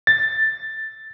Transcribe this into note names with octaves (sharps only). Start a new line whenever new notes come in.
A6